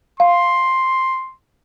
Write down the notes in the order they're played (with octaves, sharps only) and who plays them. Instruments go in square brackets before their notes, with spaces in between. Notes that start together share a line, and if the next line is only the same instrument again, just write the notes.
[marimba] F5 [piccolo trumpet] C6